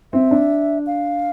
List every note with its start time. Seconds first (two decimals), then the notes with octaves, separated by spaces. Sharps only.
0.13 C4 E5
0.31 D4
0.87 F5